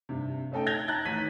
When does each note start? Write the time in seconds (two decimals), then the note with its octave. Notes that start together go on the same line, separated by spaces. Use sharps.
0.09 G2 C3
0.52 A3 C#4 D#4 A4 G5
0.66 G6 G#6 A#6 F7 G7
0.88 A5 A#5 F#6 G#6 A6
1.05 A1 D#3 B6 D#7